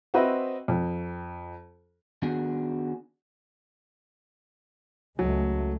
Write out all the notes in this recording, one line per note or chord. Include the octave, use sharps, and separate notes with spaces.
C4 F#4 B4 D#5 E5 B5
F2
D#3 B3 D4 F#4 G#4
C#2 F#3 G#3 A3